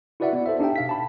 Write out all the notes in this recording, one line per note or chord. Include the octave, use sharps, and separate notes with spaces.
E4 F#4 B4 D5 E5 F#5
B3 D5
A4 C5 E5
D4 D#4 G4 E5 G5
B2 F5 B6
A5 B5